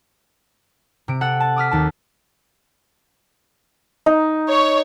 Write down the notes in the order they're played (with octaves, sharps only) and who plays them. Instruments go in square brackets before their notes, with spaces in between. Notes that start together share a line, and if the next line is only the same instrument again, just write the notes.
[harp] C3 D7
A4 F#5
A5
D6 D#6 F6 B6
D#2 A5
[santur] D#4
[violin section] C#5